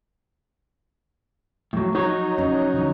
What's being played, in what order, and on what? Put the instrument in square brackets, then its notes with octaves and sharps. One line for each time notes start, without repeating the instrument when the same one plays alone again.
[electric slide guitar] A2 F#3 [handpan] F3
[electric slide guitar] F#3 C#5 [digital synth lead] D#4
[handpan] C#4 D#5
D3 F3